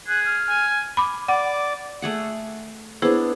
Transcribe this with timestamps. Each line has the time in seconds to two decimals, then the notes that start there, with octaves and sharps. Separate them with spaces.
0.08 G#4 F#6
0.26 F6
0.49 G#5
0.97 B5 D6
1.28 D5 F#5 D6
2.02 A3 G#4 F#5
3.02 B3 D4 E4 G#4 C5